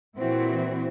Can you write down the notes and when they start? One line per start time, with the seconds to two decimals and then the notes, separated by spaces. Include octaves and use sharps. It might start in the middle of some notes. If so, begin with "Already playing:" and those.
0.17 A#2 E3 C4 E4 F#4